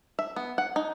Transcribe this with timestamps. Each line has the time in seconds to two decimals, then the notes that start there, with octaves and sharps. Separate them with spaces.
0.19 E5
0.36 B3
0.58 F#5
0.76 D#4